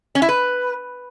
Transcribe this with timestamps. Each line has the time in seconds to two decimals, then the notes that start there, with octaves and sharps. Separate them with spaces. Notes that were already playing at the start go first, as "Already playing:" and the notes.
0.15 C#4
0.22 E4
0.29 B4